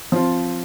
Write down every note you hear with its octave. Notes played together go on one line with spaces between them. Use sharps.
F3 C4 F4